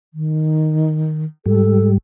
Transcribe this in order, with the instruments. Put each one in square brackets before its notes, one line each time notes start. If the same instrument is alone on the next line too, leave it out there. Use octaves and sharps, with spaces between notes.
[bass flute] D#3
[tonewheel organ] G#2 G3 [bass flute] A4